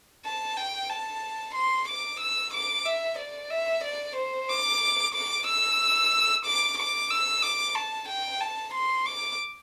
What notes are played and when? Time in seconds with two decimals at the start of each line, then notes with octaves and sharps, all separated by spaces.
0.25 A5
0.57 G5
0.89 A5
1.54 C6
1.88 D6
2.20 E6
2.54 D6
2.85 E5
3.18 D5
3.50 E5
3.84 D5
4.16 C5
4.49 D6
5.14 D6
5.47 E6
6.45 D6
6.78 D6
7.10 E6
7.43 D6
7.75 A5
8.09 G5
8.41 A5
8.74 C6
9.06 D6